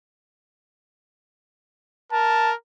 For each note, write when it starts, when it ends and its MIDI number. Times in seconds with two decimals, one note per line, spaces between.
2.12 2.55 70
2.12 2.51 81